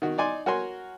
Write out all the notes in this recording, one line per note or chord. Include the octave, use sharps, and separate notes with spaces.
D#3 F#4
D#4 D5 G#5 C6
F#4 A#4 C#5 G#5 C6